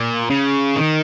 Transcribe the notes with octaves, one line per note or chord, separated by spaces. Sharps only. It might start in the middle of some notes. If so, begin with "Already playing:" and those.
Already playing: A#2
C#3
D#3